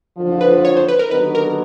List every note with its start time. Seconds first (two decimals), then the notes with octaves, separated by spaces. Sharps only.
0.18 F#1 F2 D3 F3
0.41 B4
0.65 C#5
0.77 C5
0.88 B4
0.99 A#4
1.11 D#2 D3 F#3 B3 D#4 B4
1.35 A#4